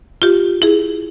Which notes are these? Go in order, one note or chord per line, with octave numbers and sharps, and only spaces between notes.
F4 G4
E4 G#4